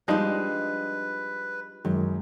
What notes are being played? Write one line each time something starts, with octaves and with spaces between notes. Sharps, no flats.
F3 G3 G#3 D4 D#4 B4
F#2 D#3 F#3 G#3